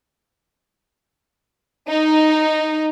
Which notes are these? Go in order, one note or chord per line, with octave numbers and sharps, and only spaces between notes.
D#4